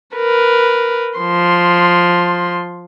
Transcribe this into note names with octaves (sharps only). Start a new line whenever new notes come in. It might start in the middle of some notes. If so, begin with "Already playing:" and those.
A#4 B4
F3 C6